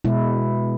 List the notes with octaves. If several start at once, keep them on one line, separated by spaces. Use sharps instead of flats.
B2 G#3 E4